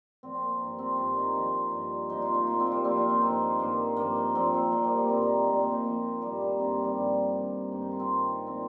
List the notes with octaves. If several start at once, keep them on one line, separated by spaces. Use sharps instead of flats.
A#2 F3 C4
C4
A#3
G2 F3
C4
G2 D#3 F4
D#4
A#2 F3 D#4
G2 F3
A#2 F3 D#4
F4
D#4
A#2 F3 F4
C4
G3
A#3
A#2 F3 C4
F4
D#4
G2 F3 C4
G2 D#3 A#3
G2 F3 A#3
D#4
A#2 F3 C4
C4
A#2 F3 A#3
G3
A#3
G2 D#3 C4
D#4
A#2 F3 C4
A#3
D#4
A#2 F3 A#3
G2 D#3 G3
A#3
G2 D#3 C4
A#3
G3
G2 F3
G2 D#3
G2 D#3 A#3
D#4
F4
C4
G2 D#3
A#2 F3 C4